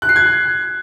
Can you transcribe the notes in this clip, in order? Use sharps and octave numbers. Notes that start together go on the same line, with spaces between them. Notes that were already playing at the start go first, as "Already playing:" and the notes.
F#6
C7
G#6